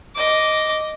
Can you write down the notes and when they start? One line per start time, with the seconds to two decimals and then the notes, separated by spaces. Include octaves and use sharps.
0.15 D#5 D6